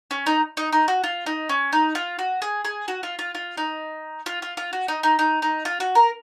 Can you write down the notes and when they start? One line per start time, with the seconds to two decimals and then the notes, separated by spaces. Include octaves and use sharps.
0.11 C#4
0.26 D#4
0.57 D#4
0.73 D#4
0.88 F#4
1.04 F4
1.26 D#4
1.49 C#4
1.73 D#4
1.95 F4
2.19 F#4
2.42 G#4
2.65 G#4
2.88 F#4
3.03 F4
3.19 F4
3.35 F4
3.57 D#4
4.26 F4
4.42 F4
4.57 F4
4.73 F#4
4.88 D#4
5.03 D#4
5.19 D#4
5.42 D#4
5.65 F4
5.80 F#4
5.95 A#4